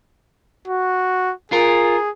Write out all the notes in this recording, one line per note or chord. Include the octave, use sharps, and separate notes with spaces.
F#4
F4 G#4 A#4